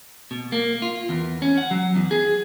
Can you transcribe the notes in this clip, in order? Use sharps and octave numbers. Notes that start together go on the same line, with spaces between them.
B2
A#3
F4
E2
C#4
F#5
F#3
E2
G#4